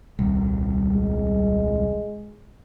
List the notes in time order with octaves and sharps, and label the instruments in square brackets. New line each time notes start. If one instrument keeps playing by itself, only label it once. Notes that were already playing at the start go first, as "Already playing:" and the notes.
[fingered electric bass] D#1 C2
[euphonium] G#3